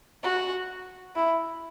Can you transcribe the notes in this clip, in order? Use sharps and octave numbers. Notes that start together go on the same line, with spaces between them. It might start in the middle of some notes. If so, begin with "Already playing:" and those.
F#4
E4